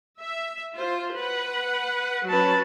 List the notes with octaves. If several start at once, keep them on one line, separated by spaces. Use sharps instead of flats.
E5
F4 C5
B4 F#5
F#3 C#4 B4 A5